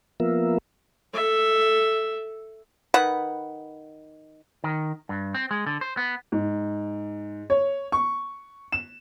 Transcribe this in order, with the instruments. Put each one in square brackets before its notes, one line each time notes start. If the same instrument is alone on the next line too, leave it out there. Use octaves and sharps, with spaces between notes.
[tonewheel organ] F3 A#3 B3 F4 A#4 E5
[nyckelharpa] A4 E5
[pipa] D#3 B4 F#5
[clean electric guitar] D#3
G2
C4
G#3
D3
C5
B3
[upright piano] G#2
C#5
C#6
E7